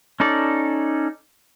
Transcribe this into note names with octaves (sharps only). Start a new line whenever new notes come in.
C#4 D#4 A4 D5